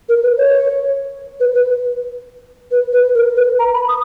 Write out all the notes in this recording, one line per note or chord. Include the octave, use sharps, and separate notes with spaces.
A#4
B4
C#5
B4
B4
B4
B4
A#4
B4
A#5
B5
D#6